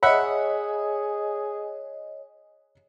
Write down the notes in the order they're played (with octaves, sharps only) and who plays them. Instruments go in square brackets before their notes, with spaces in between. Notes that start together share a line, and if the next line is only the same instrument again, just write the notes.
[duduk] G#4 [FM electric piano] C#5 D#5 [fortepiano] E5 F#5 B5